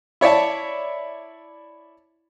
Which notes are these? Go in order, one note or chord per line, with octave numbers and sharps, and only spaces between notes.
E4 C#5 D5 E5 A5